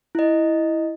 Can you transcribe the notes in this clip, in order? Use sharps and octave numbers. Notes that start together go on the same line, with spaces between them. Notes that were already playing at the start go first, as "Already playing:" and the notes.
E4 D#5